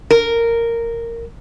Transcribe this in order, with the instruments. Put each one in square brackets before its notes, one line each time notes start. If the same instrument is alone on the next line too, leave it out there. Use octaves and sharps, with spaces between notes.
[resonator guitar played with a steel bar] A#4